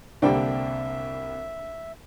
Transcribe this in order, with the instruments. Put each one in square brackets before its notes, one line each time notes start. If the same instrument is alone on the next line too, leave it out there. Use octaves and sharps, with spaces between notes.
[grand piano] C2 G5 [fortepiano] D3 G3 A#3 [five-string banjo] C4 D4 [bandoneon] E5